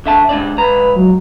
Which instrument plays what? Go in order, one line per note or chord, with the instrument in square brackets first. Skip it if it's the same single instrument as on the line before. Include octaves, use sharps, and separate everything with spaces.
[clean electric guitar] D3 E5 A5
G#2 D4 D5
[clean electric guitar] C#2 A#5 [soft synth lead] B4
[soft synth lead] F#3